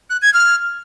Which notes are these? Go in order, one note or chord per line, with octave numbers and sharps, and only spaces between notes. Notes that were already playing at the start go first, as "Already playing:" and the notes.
F#6
G#6
F6